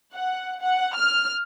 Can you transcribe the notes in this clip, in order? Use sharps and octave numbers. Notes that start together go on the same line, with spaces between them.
F#5
F#5
F6